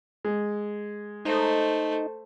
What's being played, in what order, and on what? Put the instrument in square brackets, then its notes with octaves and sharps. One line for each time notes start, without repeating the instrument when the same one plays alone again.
[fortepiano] G#3
[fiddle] A3 C5 [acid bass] D#4